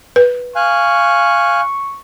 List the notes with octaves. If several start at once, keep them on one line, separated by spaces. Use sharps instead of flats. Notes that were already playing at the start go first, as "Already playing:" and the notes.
B4
F5 G#5 C#6 F#6